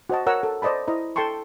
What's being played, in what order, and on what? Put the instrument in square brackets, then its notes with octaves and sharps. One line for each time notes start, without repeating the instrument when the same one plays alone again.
[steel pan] F#4 C5 D#5 A5
F#4 A#4 C#5 F#5 A#5 E6
A4
C5 D5 D#5 A5 B5
E4 C5 D#5 A#5
A4 G5 A5 C6 C#6